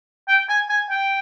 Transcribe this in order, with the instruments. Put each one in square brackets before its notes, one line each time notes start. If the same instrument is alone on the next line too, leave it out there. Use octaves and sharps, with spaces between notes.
[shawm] G5
G#5
G#5
G5